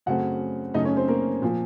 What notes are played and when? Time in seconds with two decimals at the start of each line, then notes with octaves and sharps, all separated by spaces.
0.06 F#2 C#3 A3 C4 F#4 F#5
0.74 F#2 C#3 A3 D#4 D#5
0.85 C#4 C#5
0.97 C4 C5
1.08 A#3 A#4
1.42 A#2 F3 A#3